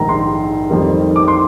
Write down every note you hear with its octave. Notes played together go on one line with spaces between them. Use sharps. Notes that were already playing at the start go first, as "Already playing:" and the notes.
Already playing: A#1 G#2 D#3 A#5
C6
F2 D#3 G3 A#3
D6
C6